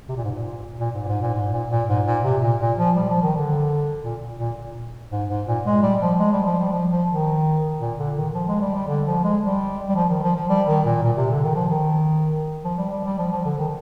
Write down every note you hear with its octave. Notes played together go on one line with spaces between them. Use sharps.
C3
A#2
G#2
A#2
A#2
G#2
G#2
A#2
G#2
A#2
A#2
G#2
A#2
C3
A#2
A#2
F3
G3
F3
D#3
D3
A#2
A#2
G#2
G#2
A#2
G#3
G3
F3
G#3
G3
F3
G3
F3
F3
D#3
A#2
D3
D#3
F3
G#3
G3
G3
D3
F3
G#3
G3
G3
F3
D#3
F3
F3
G3
D#3
A#2
A#2
C3
D3
D#3
F3
D#3
F3
G3
G3
G3
F3
F3
D3
D#3